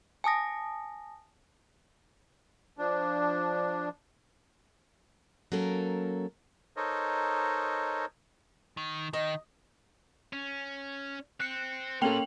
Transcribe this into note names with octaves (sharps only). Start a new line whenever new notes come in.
G#5 A5 D#6 A#6
F3 D4
F#3 A#3 C#4 A4 A#4
D#4 A4 A#4 C5 C#5 D#5
D#3
D#3 D#5
C#4
C4 F#6 C#7
A#3 C#4 A4 A#4 G5 C6 F7 F#7